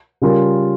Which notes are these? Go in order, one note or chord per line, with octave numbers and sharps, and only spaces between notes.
C#3 G3 C#4 F4 A#4